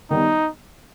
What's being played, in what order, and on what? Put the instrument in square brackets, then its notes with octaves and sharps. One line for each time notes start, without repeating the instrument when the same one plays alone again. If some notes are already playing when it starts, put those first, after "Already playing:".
[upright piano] D#3 G3 B3 [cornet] D#4